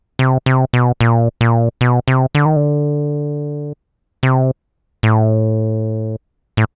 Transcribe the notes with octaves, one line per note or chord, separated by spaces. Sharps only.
C3
C3
B2
A#2
A#2
B2
C3
D3
D#3
D3
C3
A2
A2